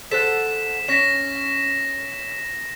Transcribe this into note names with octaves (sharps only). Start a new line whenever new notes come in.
A4 C5 F#5 B6 E7
C#4 A#6 B6 E7